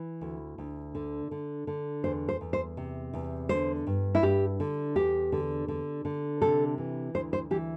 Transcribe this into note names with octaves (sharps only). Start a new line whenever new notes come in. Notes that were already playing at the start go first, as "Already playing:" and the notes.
Already playing: E3
D2
D2
D3
D3
D3
E2 C5
C5
E2
C5
C3
E2
D3 C5
G2
E4
G2 G4
D3
E2 G4
D3
D3
D3
C3 A4
E3
D2 C5
C5
E3 G4